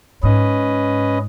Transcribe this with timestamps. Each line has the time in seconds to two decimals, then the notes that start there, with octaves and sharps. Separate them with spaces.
0.23 G#2 C#4 B4 D#5